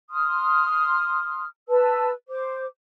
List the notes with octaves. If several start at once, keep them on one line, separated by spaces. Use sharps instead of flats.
C6 D#6 F6
B4 A5 E6
C5 D6